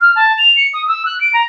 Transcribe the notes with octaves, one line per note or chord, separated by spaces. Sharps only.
F6
A5
F7
C#7
D#6
E6
F#6
D7
A#5